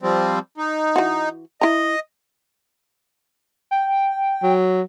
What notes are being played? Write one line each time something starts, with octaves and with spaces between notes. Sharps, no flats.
F3 G3 C4
D#4
E3 F#4
E4 D#5 A#5
G5
F#3